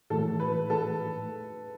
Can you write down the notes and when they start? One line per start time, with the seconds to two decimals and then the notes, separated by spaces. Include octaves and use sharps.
0.10 A2 E3 A3 A4
0.40 B4
0.70 A4